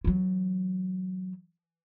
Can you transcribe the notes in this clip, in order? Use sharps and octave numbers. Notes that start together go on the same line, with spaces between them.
E3 F#3